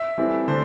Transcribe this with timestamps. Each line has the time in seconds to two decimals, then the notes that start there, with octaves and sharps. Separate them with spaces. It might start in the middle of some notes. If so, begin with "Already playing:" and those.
Already playing: E5
0.18 E3 G3 C4 E4 A4
0.48 D3 A3 C5